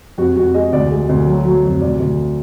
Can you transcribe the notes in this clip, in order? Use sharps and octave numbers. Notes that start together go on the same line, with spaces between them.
F2 F#4
F2 F#4
G#3 D#5
D2 D5
G#3
D2
F#3
F#3
F2
D2 D5
D2